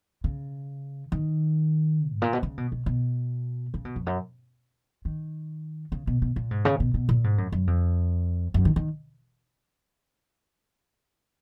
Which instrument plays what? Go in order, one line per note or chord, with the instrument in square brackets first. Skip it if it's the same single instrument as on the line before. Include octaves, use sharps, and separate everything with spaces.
[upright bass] C#3
D#3
G#2
A#2
B2
C#3
B2
B2
B2
C#3
B2
F2
F#2
D#3
C#3
B2
B2
A#2
G#2
C#3
B2
B2
A#2
G#2
F#2
F#2
F2
F#2
D#3
D#3